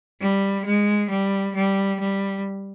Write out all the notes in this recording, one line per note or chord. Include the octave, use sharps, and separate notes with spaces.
G3
G#3
G3
G3
G3